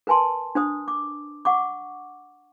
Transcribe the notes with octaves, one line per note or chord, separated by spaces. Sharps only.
A#4 B4 G#5 A5 C6
D4 C5 D#6
D6
F#5 C#6 D6